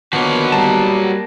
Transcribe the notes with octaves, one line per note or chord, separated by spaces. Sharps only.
D3 D#3 F3 A#3 B3 F#4 B4 C#5
G3 A#3 A#4 A5